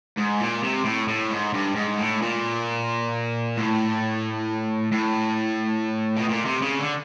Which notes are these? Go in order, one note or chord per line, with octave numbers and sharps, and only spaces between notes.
G#2
A#2
C3
A2
A2
G#2
G2
G#2
A2
A#2
A2
A2
B2
A#2
C3
C#3
D3